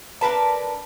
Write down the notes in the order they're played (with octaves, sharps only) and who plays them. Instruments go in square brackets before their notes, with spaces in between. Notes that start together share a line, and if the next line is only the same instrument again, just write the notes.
[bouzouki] D4 A#4 B4 A5